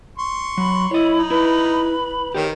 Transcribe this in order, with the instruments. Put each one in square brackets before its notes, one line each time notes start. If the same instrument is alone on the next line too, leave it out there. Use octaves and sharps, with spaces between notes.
[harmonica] C6 C#6
[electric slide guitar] F#3 [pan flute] B5
[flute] E4 [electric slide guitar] C#5 D#5
[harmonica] D#4
[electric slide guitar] E4 [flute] B4
[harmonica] D#3 [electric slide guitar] G4 C#5 [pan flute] A#4